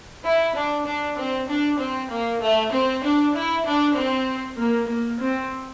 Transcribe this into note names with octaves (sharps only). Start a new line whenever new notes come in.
E4
D4
D4
C4
D4
C4
A#3
A3
C4
D4
E4
D4
C4
A#3
A#3
C4